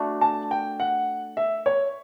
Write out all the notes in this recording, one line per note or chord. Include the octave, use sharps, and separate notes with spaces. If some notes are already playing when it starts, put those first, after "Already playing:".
Already playing: A3 D4 F#4
A5
G5
F#5
E5
C#5